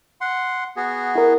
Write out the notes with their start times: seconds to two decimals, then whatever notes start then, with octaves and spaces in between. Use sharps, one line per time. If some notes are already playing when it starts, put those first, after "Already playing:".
0.21 F#5 C6
0.76 B3 F#4 G#4
1.15 E4 A#4